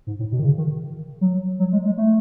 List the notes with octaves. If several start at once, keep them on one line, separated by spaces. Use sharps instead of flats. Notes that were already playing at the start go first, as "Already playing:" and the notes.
G#2
A2
B2
D#3
C#3
D#3
F#3
F#3
G#3
G#3
A3